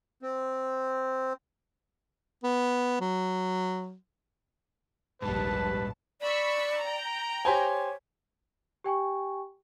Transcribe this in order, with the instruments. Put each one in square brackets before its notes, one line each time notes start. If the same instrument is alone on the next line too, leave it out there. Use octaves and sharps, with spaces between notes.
[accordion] C4
[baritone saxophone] B3
F#3
[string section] A#1 D#2 A5 [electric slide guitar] G#2 G3 [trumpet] B4
[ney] D5 [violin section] B5 C#6 E6
[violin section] G5 A#5
[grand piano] G4 C5 G#5 [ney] C#5
[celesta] G4 G5 G#5 C#6